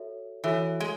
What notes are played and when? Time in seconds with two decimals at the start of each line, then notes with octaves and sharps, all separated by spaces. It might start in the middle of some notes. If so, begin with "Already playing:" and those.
Already playing: F#4 A4 C#5 E5
0.44 E3 F#4 A4 C#5 E5
0.80 G#3